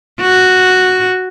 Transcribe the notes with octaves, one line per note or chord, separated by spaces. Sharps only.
F#4